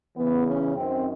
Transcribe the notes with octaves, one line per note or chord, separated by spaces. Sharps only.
E2 C#3 E3 B3
C#4
F#2 D#3 C4